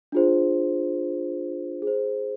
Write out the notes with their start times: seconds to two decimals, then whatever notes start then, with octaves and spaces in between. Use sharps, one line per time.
0.12 D4 F4 G#4 C5
1.82 G#4
1.87 C5